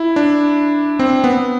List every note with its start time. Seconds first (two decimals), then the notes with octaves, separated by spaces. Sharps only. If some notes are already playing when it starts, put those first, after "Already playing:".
Already playing: E4
0.16 D4
0.99 C4
1.24 B3